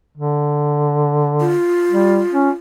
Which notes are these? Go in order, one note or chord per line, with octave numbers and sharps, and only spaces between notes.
D3
F4
G3
C#4